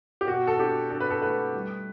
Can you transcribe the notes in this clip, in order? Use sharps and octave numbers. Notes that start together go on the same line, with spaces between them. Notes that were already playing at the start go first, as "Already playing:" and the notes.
G4
B2 F#4
A4
D4 G4
D4 A4
B4
A4
A3 B4
G3